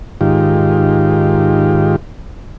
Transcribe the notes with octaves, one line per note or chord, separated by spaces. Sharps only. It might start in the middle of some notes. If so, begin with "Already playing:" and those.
G#2 D#3 F4 G4